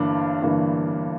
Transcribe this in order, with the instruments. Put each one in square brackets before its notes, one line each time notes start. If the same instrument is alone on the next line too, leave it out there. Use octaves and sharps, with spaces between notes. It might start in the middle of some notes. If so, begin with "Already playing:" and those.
Already playing: [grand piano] G1 G2 E3 A#3 D4
G1 G2 E3 A#3 D4